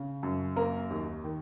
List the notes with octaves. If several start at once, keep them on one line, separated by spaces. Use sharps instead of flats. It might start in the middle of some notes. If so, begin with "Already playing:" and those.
Already playing: C#3
F#2
A#3 A#4 A#5
D#2
D#3